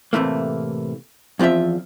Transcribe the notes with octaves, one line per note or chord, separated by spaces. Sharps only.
A2 C3 E3 A3 A#3
E2 F3 C4 F4 E5